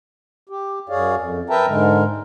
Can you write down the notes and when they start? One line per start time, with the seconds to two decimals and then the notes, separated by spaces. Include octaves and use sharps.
0.49 G4
0.89 F#2 G#4 C#5 D5 F5
1.16 F2
1.50 A#4 B4 E5 G5 A5 A#5
1.68 G#2 D3 G#3 A#4